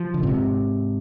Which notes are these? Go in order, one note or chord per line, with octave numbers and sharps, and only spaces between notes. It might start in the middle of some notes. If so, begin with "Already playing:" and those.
Already playing: F3
D3
G#2 C3